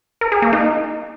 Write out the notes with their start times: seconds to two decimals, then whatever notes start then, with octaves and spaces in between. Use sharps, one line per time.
0.21 A#4
0.32 G#4
0.42 A#3
0.53 D#4